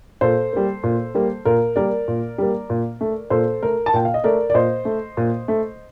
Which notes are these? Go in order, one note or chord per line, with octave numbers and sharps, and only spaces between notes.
A#2 A4 C5
G3 A#3
A#2
G3 A#3
A#2 A#4
G3 A#3 A#4 D5
A#2
G3 A#3
A#2
A3
A#2 A4 C5
A3 A#4
A5
A#2 G5
F5
D#5
A3 A#4 D5
D5
A#2 C5 D#5
A3
A#2
A3